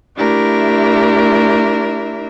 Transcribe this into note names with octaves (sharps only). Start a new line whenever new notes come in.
A3 D4 E4 G4 A#4 E5